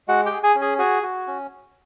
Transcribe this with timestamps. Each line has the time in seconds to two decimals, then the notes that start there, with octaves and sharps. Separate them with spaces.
0.08 G#3 F#4 F#5
0.25 G4 G5
0.31 G#4
0.43 G#4 G#5
0.55 C#4
0.61 G#4 G#5
0.79 F#4 G#4 G#5
1.02 F#4
1.27 C#4